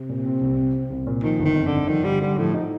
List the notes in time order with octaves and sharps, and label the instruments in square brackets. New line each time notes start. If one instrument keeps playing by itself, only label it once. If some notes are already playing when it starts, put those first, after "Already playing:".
Already playing: [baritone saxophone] C3
[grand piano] A#2
C4
C2
C4
C4
C2
A#2
[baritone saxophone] D#3 [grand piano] F3
[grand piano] G1
[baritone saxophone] D#3
[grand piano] F2
[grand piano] G1 [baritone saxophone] D3
[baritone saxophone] D#3 [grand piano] F3
[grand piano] D3 [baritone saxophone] G3
[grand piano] D3 [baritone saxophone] G3
[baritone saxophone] A2 [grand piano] F3
[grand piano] D#4